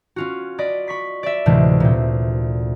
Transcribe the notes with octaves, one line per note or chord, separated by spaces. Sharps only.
C#4 F4 F#4
D5 D#5 B5
B5 C#6 B6
D5 E5
D2 A2 C3 E3 G#3
A#2 C4